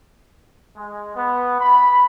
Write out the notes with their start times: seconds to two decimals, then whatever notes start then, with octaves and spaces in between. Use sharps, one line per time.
0.76 G#3
1.15 B3
1.60 B5